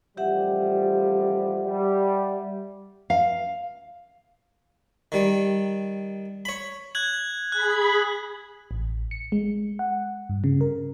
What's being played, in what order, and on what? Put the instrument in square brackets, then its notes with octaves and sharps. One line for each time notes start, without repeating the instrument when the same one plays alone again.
[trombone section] A1 F3 G3 [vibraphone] G4 E5 F#5
[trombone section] G3
[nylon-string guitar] F5
[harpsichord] D#3 G3
C#5 B5
[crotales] F#6 G#6 F#7
[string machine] G#4 B5 [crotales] F#6
[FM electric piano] A1
C#7
G#3
F#5
G2
C#3
A#4